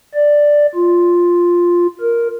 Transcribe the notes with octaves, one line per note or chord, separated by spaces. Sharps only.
D5
F4
A#4